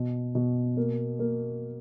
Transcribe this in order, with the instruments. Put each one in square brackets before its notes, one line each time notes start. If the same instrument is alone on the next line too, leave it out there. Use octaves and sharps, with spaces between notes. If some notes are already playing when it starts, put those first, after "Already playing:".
Already playing: [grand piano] B2
B2
A#3
A#3